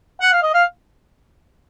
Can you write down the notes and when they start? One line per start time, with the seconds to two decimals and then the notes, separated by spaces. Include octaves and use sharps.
0.21 F#5
0.32 F5
0.43 D#5
0.54 F5